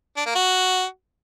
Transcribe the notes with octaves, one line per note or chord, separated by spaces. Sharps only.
D4
A#3
F#4